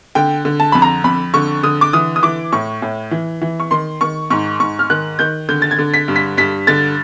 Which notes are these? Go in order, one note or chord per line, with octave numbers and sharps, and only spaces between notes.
D3 G5
D3
A5
F2 B5
A#5
F2 B5
D3 C#6
D3 D#6
D6
E3 D#6
D#6
E3 D6
A2 C#6
A2
E3
E3
C#6
D#3 C6
D#3 C#6
G#2 C#6
G#2 C#6
F6
D#3 F#6
D#3 G6
D3 G6
A6
G#6
D3
B6
G2
B6
G2 B6
D3 A6